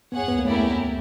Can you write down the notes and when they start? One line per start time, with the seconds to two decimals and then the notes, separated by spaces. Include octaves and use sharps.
0.12 B3 G#4 C#5 F#5
0.28 B3
0.39 A#3
0.45 A3 C#4 E4 G4 A#4 D5